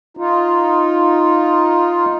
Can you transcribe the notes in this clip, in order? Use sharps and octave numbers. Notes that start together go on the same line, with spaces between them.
D#4 F4